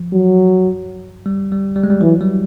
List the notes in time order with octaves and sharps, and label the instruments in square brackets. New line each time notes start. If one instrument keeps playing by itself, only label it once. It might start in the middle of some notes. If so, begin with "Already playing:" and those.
Already playing: [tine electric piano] F3
[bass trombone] F#3
[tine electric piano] G3
G3
G3
G#3
G3
[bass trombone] E3 [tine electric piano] F#3
[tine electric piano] G3